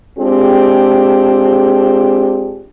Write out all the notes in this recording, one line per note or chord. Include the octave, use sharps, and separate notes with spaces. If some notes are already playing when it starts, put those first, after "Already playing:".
G#3 C4 D4 F4 G4 G#4